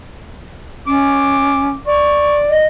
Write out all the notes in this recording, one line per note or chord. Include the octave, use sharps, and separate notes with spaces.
C#4 D6
D5 C#6
D#5